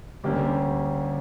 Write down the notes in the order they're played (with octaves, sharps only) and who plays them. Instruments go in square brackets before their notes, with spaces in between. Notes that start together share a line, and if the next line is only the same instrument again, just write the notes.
[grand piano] D2 D3 G3 A#3 C#4 G4